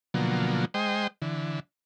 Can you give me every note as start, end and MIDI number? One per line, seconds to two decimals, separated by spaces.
0.14 0.65 47
0.14 0.65 50
0.14 0.65 53
0.14 0.65 54
0.14 0.65 58
0.74 1.07 56
0.74 1.07 72
0.74 1.07 75
0.74 1.07 79
1.22 1.60 50
1.22 1.60 52